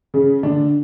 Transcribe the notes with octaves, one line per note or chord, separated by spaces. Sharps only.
C#3 C#4
D3 D4